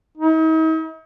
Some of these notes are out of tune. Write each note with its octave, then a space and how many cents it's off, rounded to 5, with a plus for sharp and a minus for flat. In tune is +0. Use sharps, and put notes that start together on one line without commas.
D#4 +45